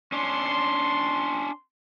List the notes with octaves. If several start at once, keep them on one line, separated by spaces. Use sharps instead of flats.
C#4 D4 C6